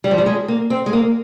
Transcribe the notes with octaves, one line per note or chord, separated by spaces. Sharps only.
G3
F3
G3
G#3
A#3
C4
G#3
A#3